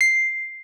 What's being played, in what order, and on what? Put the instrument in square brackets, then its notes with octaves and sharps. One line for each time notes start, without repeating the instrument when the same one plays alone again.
[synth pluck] C7